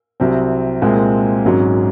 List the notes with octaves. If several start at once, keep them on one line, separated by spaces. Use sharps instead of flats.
C2 C3 F#3 C4
C2 A#2 G#3 C4
G#1 G#2 F#3 C#4